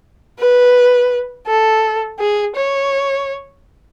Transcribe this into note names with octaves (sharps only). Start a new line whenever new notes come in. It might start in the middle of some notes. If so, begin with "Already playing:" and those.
B4
A4
G#4
C#5